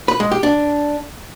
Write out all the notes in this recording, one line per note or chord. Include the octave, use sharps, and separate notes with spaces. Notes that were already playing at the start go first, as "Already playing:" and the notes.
B4
G#3
G4
D4